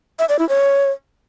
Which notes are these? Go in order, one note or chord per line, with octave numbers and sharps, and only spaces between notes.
E5
D5
E4
C#5